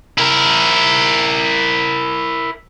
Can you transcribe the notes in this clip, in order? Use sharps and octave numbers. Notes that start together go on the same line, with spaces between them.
E4 A#4